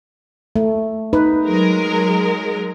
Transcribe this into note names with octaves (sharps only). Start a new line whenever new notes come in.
A3
D#4 B4
F#3 G#3 A#4